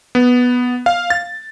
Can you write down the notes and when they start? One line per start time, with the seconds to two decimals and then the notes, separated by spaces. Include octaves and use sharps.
0.15 B3
0.86 F5
1.10 A6